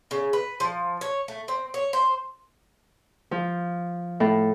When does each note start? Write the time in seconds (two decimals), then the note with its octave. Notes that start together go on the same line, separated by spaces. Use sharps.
0.11 C#3
0.33 B4
0.60 F3
1.01 C#5
1.28 A3
1.48 C4
1.74 C#5
1.93 C5
3.31 F3
4.20 A2